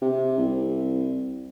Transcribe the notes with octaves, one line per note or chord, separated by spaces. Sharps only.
C3
C2